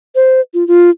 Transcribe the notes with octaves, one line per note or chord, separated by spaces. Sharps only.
C5
F4
F4